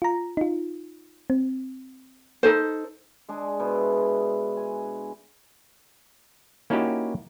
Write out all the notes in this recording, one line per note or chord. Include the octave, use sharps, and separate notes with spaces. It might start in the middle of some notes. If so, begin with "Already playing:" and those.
F4 A#5
D#4 F4
C4
D#4 A4 C5
G#3 D4 G#4
B2 E4 C5
G#5
A#3 C#4 D#4 E4 F#4 G4